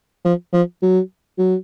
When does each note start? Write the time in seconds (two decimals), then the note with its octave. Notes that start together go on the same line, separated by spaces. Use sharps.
0.25 F3
0.53 F3
0.82 F#3
1.38 F#3